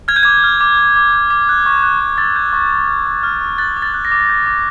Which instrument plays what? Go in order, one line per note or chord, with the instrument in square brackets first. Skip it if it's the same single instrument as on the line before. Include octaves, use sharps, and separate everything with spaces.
[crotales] F6 G#6
G6
D6 G#6
F6
D6
G6
D6
G6
D6
F#6
C#6
F#6
C#6
E6 A6
G6
C#6
C#6
F6
C#6
F6
C#6
F#6 A6
D6
A6
F#6
A#6
D6
G6
D6